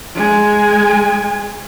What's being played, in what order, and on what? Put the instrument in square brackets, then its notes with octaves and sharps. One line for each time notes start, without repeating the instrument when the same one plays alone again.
[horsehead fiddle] G#3 G#5